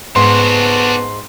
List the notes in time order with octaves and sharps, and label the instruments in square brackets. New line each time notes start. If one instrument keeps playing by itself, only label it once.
[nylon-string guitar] G#2 [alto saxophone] B3 [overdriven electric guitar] D4 F#4 [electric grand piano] C6